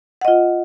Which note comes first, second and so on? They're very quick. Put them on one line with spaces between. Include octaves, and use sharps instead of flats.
F#5 D#5 F4